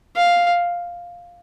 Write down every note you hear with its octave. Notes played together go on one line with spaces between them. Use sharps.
F5